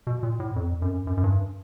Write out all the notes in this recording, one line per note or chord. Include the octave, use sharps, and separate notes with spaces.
B2
A#2
A2
F2
F#2
F#2
F#2
G2